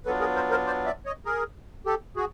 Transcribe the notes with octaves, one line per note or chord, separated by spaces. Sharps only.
F#3 B3 D4 F4 A4 B4
G#4 A#4
A#4 C5
A#4 C5
C5 D5
D5 E5
C#5 D#5
G#4 A#4
G4 A4
F#4 G#4